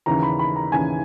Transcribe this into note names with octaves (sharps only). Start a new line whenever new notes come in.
D#2 C#3 E3 A#5
B5
B5
A#5
D#2 C#3 E3 G#5